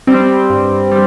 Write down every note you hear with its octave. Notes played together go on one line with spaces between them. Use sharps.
G3 C4
G2
G3